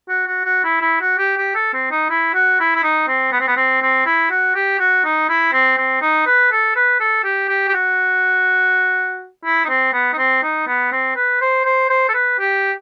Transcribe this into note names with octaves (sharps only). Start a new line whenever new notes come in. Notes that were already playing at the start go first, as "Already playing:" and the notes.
F#4
F#4
F#4
E4
E4
F#4
G4
G4
A4
C4
D#4
E4
F#4
E4
E4
D#4
C4
B3
C4
B3
C4
C4
E4
F#4
G4
F#4
D#4
E4
C4
C4
D#4
B4
A4
B4
A4
G4
G4
G4
F#4
E4
D#4
C4
B3
D#4
C4
D#4
B3
C4
B4
C5
C5
C5
A4
B4
G4